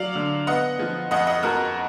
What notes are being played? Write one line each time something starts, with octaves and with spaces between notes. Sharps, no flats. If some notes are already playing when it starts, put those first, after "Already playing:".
Already playing: F#3 D5 F5
D3
B3 D#5 F#5
F3
F2 D#5 F#5
D#5 F#5
F2 F#4 A#4